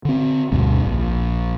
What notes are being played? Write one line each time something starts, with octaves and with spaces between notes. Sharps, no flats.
D3 C4
D2 G2 B2
A#1